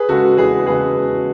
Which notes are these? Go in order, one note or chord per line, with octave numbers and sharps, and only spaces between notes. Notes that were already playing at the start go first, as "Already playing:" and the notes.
Already playing: G#4 B4
C#3 G#3 F#4 A4
E2 G#4 B4
C#3 G#3 G#4 B4
E2